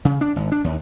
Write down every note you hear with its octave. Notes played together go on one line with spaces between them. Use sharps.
C#3
D4
G#1
D4
D#2